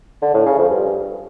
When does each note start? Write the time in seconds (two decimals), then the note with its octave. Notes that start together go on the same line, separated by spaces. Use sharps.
0.22 D3
0.34 A2
0.46 C#3
0.58 F2
0.70 G2